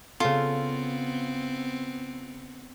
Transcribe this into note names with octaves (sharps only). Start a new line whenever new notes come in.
C#3 B3 C4 F4 A4